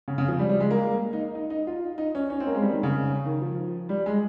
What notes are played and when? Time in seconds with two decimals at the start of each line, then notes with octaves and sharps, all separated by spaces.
0.08 C#3
0.18 C#3
0.28 F3
0.39 G3
0.49 G3
0.60 G#3
0.71 A#3
1.13 D#4
1.35 D#4
1.50 D#4
1.67 F4
1.98 D#4
2.15 C#4
2.30 C#4
2.40 C4
2.47 A#3
2.55 G#3
2.62 G3
2.72 D#3
2.83 C#3
3.26 D#3
3.42 F3
3.89 G3
4.06 G#3